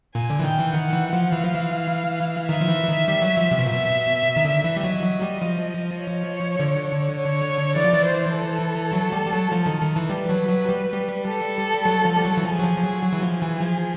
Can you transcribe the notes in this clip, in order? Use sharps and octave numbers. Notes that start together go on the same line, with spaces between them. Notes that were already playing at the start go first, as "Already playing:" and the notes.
A#2 G#5
D3
E3
D#3 G5
E3
D#3 F#5
E3
F3
E3 F5
F3
E3
D#3 E5
F3
E3
E3
D#3
G3
F#3
F3
C3
B2
A#2 E5
B2
D#3
D3
E3
G3
F#3 D#5
F#3
G3
F3
C#5
D3
C#5
E3 D5
F3
E3
C5
A4
F#3
G3
G3
F#3
F3
D#3
D#3
E3
G3 B4
F#3
F#3
G3
G3
A4
F#3
F3
G3
F#3
E3
F3 G#4
F#3
F3
F3
F#3
F#3 G#4
E3
F3
E3
F3